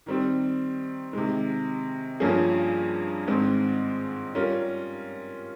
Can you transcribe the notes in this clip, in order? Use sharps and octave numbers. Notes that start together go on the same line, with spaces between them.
D#3 G3 C4
C3 D#3 G#3
G2 F3 A#3 C#4 G#4
G#2 D#3 G#3 C4
G3 C#4 F4 A#4